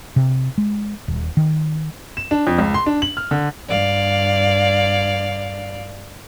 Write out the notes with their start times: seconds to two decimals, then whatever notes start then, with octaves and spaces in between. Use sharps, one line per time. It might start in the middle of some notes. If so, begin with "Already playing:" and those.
0.16 C3
0.58 G#3
1.08 D#1
1.37 D#3
2.17 E7
2.31 D4
2.47 F2
2.58 C#2
2.74 C6
2.86 D4
3.02 F#7
3.17 F6
3.31 D3
3.68 G2 D5 F5